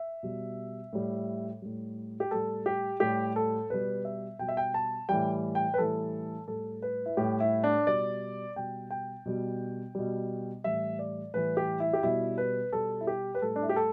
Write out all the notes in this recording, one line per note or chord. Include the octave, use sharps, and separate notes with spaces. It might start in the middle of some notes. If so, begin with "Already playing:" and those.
Already playing: E5
B2 G3
A2 G3
A2 G3
G4
A2 G3 A4
G4
A2 G3 G4
A4
B2 G3 B4
E5
B2 G3 G5
E5
G5
A5
A2 E3 G3 G5
G5
B4
A2 E3 G3 A4
A2 G3 A4
B4
E4
A2 G3 G4
E4
D4
B2 G3 D5
B2 G3 G5
G5
B2 G3
B2 G3
A2 E3 G3 E5
D5
A2 E3 G3 B4
G4
E4
G4
B2 G3 E4
B4
B2 G3 A4
E4
G4
B4
A2 G3 A4
D4
E4
G4
A4